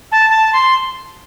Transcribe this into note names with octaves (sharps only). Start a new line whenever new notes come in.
A5
A5
C6